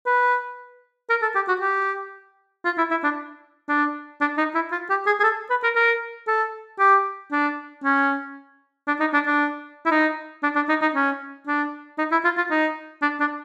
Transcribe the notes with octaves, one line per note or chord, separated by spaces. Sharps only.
B4
A#4
A4
G4
F#4
G4
F4
E4
E4
D4
D4
D4
D#4
E4
F4
G4
G#4
G#4
A4
B4
A#4
A#4
A4
G4
D4
C#4
D4
D#4
D4
D4
E4
D#4
D4
D4
D#4
D#4
C#4
D4
D#4
E4
F4
F4
D#4
D4
D4